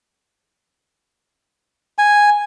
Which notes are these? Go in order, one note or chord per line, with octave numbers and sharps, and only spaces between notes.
G#5